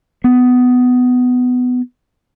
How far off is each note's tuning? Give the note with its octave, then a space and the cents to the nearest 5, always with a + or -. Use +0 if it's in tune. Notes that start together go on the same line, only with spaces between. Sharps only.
B3 +15